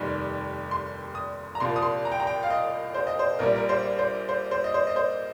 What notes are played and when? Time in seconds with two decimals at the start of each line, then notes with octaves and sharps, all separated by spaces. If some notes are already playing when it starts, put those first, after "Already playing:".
Already playing: F1 D#2 D#3 G3
0.71 C6
1.15 D#6
1.55 A#5
1.60 C2 A#2 F3 C6
1.76 D#6
1.82 C6
2.05 A#5
2.12 G5
2.20 A#5
2.27 G5
2.43 F5
2.50 D#5
2.94 C5
3.07 D#5
3.19 C5
3.39 A#1 A#2 G3 A#4
3.56 A#4
3.69 C5
3.99 C5
4.29 C5
4.51 C5
4.64 D#5
4.74 C5
4.87 D#5
4.96 C5